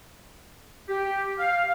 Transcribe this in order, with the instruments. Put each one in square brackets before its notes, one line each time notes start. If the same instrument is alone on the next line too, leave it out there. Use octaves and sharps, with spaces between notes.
[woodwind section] G4
F5